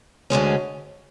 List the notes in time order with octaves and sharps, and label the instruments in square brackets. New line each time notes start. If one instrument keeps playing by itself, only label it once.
[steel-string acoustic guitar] D2 D3 G#3 C#4